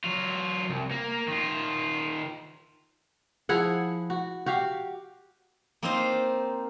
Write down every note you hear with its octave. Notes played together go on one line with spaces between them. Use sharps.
F#3 F4
C2
A#3
D#3 F4
F3 E4 G#4 F#5
F#4
F#4 G4 F5
A#3 C4 D#4 F4 A#4 C5